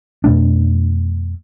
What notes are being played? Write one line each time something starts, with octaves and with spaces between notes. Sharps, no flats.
F2 B2 A3 D4